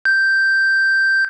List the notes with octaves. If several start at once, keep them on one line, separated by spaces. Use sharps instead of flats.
G6